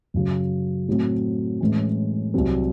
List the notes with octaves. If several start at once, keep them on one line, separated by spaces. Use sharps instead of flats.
F#2 C#3 F#3
A2 F#3 A3 C4
A2 E3 G#3 C#4
C2 C3 F#3 C4